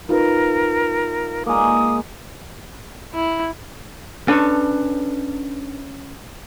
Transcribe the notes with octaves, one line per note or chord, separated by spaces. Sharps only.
D#4 F4 A#4 B4
G#3 A#3 D#6
E4
C#4 D4 A4 B4 C#5